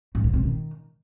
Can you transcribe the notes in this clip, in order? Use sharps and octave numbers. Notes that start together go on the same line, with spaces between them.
G#2
B2
C3
D#3